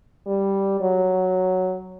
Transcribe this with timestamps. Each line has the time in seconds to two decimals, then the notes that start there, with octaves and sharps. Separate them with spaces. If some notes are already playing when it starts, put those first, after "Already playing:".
0.26 G3
0.81 F#3